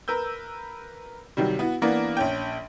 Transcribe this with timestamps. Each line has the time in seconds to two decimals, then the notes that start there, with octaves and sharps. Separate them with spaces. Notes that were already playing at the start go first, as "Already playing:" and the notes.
0.08 A#4 B4 E6 G6
1.37 C3 D#3 F#3 G3
1.59 B3 E4 F#4
1.82 E3 A#3 B3 D4
2.17 A#1 C#4 G5